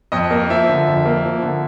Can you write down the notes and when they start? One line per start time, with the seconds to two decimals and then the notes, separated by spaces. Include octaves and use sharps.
0.12 F2 D#5
0.31 A#3
0.50 F3 E5
0.69 D3
0.87 F2
1.06 A#3
1.25 F3
1.43 D3